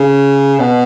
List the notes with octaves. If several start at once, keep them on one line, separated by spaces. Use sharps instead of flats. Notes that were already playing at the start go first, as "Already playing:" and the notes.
Already playing: C#3
B2